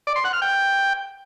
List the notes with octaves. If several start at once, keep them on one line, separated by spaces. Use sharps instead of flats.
D5
C6
F#5
F6
G5